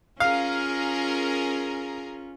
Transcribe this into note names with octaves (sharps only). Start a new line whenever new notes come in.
C#4 F4 G#4 A#4 F5 A#5